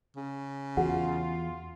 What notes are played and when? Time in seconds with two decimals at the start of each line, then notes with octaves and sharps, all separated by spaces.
0.16 C#3
0.77 E2 F4 F#4 G#4 F#5